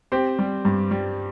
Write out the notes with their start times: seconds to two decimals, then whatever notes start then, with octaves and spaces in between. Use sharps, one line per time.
0.12 C4 G4 C5
0.39 G3
0.65 G2
0.91 G3